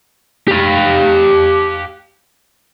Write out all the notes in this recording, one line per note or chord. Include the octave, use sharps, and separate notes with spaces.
G4 F5